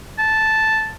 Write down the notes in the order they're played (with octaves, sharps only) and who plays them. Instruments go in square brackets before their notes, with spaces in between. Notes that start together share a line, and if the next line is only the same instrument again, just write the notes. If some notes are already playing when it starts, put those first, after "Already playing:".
[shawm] A5